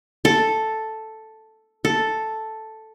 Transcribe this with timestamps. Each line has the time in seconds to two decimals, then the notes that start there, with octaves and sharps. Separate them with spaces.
0.25 A4
1.85 A4